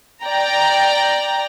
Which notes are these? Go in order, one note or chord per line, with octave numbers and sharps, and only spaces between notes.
D5 G5 A#5